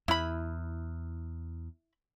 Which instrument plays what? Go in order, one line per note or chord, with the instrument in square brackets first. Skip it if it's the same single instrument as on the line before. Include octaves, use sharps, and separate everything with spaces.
[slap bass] E2 [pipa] E4 B5